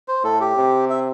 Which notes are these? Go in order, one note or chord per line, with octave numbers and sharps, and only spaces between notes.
C5
A2 A4
G4
C3
E5